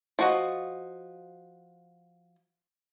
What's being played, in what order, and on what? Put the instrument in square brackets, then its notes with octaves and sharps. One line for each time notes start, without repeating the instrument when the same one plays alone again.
[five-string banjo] F3 F#4 D#5